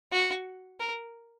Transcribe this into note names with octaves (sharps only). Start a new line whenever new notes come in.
F#4
A#4